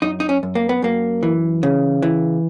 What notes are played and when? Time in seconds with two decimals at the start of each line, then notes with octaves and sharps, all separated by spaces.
0.02 F#2 D#4
0.20 D#4
0.29 C#4
0.43 F#2
0.55 A#3
0.69 B3
0.82 F#2 A#3
1.23 E3
1.63 C#3
2.02 E3